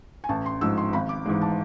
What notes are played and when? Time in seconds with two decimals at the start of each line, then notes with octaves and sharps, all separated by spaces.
0.24 G#5
0.29 A1 A5
0.46 C6
0.61 G#2 F3 G#3 E6
0.77 C6
0.93 G#1 B5
1.09 D6
1.26 G#2 E3 G#3
1.41 A5